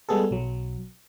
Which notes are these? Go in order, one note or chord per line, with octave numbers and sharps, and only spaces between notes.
G3 G#3 B3 G#4 A4
B1 F#3